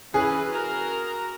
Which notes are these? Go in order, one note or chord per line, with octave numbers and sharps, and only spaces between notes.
E3 C#4 G#4 B4
F#4 A#4 A#5